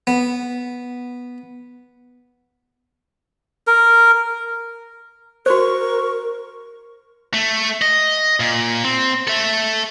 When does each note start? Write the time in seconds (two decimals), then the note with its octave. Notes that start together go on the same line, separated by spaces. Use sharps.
0.07 B3
3.67 A#4
5.46 F#4 A#4 C5 C#6
7.34 A3
7.82 D#5
8.40 A#2
8.84 C4
9.27 A4 E5